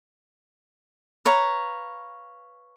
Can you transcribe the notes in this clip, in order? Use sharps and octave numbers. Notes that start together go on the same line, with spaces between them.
B4 C#5 F5 A#5